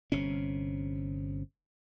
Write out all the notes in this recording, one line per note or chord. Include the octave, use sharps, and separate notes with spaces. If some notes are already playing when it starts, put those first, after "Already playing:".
G1 C3 C#4